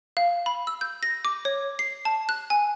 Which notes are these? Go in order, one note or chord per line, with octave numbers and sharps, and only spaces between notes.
F5
B5
E6
G6
A#6
D6
C#5
C7
A5
F#6
G#5